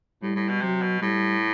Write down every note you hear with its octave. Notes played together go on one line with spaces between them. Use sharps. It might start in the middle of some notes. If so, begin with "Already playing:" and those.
A2 G3
A2
B2
C3 F#3
B2
A2 G3